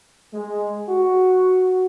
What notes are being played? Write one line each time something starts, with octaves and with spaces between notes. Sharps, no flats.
G#3
F#4